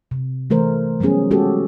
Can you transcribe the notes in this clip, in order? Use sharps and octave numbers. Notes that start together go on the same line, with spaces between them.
C3
E3 A3 A#4 C5
F#3 G3 B3 C#4 G#4
G#3 C#4 F#4 G4 A4